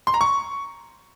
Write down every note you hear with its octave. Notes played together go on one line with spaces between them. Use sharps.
C6
A#5
C#6